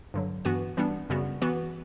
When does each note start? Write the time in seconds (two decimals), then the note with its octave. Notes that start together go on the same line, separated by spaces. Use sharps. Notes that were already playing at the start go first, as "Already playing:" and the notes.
0.14 G2 D3 F#3
0.45 G2 E3 B3 F#4 B4
0.77 E3 G3 B3 D4
1.10 F#2 C#3 G3 B3 F#4
1.42 E3 B3 F#4 B4